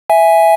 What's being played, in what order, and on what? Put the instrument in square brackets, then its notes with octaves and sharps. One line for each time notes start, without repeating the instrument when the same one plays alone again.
[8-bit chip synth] E5 G#5